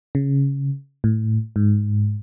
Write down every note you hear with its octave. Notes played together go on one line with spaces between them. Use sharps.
C#3
A2
G#2